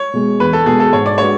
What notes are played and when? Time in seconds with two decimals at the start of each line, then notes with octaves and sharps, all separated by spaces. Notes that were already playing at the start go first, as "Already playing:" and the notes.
Already playing: C#5
0.13 B2 G#3
0.40 E2 B4
0.53 A4
0.66 B2 G#3 G#4
0.80 A4
0.93 G#2 C#5
1.06 D5
1.18 G#3 D4 F#4 B4 C#5